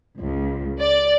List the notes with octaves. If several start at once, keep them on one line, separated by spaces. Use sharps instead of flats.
C#2
D5